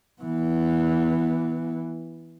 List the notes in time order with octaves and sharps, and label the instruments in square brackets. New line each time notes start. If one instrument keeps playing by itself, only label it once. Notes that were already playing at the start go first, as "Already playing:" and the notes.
[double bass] E3 B3